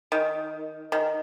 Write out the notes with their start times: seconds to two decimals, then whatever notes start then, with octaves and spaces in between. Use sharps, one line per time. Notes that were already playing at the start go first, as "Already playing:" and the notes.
0.12 D#3
0.92 D#3